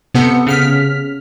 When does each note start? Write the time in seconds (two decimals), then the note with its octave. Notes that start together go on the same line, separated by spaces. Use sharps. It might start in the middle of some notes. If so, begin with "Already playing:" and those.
0.14 C3 B3 A4 C#7
0.47 C#3 F6 B6